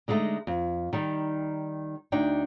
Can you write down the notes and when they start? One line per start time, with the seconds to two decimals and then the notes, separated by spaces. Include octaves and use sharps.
0.08 D3 G#3 A3 B3 D#4
0.47 F2
0.93 D#3 G3 D#4
2.12 D2 D4 D#4 G5